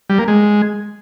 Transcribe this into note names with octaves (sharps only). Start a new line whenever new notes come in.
G3
A#3
G#3